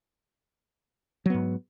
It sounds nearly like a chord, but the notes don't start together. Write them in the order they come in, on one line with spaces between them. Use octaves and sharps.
F#3 B3 G#2